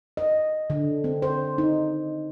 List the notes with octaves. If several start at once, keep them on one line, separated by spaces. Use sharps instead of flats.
D#5
D3
C4
C5
D#4